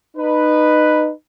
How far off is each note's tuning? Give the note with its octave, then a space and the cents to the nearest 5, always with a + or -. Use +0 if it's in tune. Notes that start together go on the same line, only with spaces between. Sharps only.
D#4 -25 B4 +0